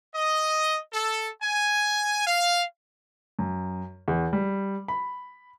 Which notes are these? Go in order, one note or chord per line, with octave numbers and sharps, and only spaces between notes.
D#5
A4
G#5
F5
F#2
E2
G3
B5